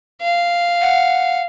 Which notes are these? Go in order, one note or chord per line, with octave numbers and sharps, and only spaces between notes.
F5
F#5